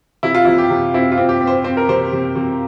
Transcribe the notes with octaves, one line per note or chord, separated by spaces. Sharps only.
C3 E4
F4
C3 E4
G4
C3
C4 E4
F4
C4
G4
C4
C5
C4 C5
A#4
C3 C5
C3
C3